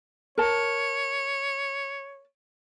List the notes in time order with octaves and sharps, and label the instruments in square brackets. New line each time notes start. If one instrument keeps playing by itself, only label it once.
[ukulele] A#4 A5 [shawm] C#5